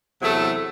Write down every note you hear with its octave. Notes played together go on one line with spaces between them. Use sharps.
E2 C3 F#3 A3